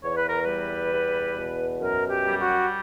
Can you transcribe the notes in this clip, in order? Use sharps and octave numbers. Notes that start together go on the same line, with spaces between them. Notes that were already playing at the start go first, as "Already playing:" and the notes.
E2 C#5
B4
A#4
G3 B4
E2
B2
F#2 A#4
G4
G3
F#4